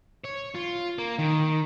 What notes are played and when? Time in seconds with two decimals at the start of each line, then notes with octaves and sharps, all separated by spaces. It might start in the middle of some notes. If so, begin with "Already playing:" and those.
0.24 C#5
0.54 F4
0.98 A#3
1.18 D#3